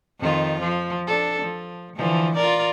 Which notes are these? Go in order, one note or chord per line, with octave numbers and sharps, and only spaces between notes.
F2 D#3 F4
F3
D4 A4
F3
D3 E3 F3
F4 A#4 D5